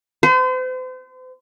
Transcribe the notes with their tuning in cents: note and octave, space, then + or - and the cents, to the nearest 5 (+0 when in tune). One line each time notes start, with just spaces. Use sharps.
C5 -40